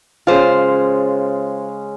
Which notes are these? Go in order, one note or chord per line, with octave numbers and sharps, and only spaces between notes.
C#3 G#3 F4 C5